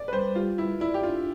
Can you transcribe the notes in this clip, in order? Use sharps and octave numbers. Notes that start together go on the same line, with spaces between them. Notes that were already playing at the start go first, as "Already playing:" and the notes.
Already playing: D5
B4
G3 C5
F4 G4
E4 B4
E4 D5
G4
D4 F4